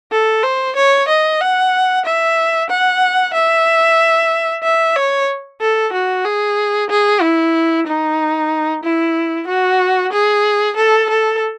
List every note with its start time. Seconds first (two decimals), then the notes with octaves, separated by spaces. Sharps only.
0.11 A4
0.43 C5
0.76 C#5
1.08 D#5
1.41 F#5
2.05 E5
2.70 F#5
3.34 E5
4.64 E5
4.96 C#5
5.61 A4
5.93 F#4
6.26 G#4
6.90 G#4
7.22 E4
7.87 D#4
8.84 E4
9.48 F#4
10.13 G#4
10.77 A4
11.10 A4